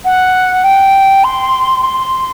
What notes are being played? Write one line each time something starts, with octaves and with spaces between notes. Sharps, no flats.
F#5
G5
C6
C6